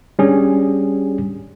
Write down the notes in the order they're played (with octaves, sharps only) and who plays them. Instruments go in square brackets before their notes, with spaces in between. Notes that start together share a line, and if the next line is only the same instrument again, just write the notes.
[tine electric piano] G3 C#4 D4 G#4